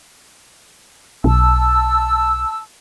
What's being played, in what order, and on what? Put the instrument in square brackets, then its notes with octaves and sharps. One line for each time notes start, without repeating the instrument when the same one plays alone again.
[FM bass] B1 [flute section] A5 E6